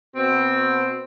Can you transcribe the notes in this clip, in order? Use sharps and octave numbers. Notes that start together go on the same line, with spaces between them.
B2 C4